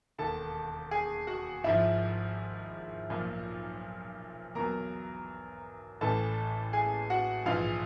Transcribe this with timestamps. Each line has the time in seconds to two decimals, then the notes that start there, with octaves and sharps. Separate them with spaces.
0.18 E1 D#2 D#3 A4 A5
0.91 G#4 G#5
1.27 F#4 F#5
1.64 G#1 G#2 F3 E4 E5
3.10 B1 A#2 F3
4.55 E2 B2 F#3 A#4 A#5
6.01 A1 A2 E3 A4 A5
6.73 G#4 G#5
7.10 F#4 F#5
7.46 A#1 G#2 E3 F4 F5